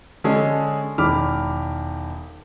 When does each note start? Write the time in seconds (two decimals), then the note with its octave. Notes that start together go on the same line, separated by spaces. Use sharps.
0.24 D3 G#3 C#4 G#4 A4
0.98 E1 D#3 B5 D6 F6